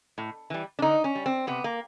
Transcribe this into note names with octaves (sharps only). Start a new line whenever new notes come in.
A2
E3 G3
D4
D3 D#4
C#4
G3
C4
C3 B3
A#3